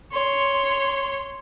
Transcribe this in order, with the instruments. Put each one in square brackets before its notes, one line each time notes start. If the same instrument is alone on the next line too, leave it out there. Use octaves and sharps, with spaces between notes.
[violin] C#5 C6